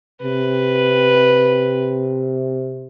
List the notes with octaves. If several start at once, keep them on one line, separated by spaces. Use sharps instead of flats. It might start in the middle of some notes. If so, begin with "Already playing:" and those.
C3 B4